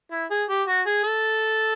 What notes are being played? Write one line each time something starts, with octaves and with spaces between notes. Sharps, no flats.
E4
G#4
G4
F#4
G#4
A4